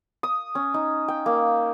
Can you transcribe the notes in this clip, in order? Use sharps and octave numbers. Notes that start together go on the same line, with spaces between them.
D#6
C#4
D#4
G5
A#3